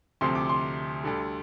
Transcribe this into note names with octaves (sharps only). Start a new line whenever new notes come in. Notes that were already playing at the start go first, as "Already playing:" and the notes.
D2 C3 F3 C6
D6
C6
D2 D3 G3